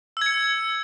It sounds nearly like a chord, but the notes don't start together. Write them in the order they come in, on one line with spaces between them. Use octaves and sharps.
E6 G#6 C#7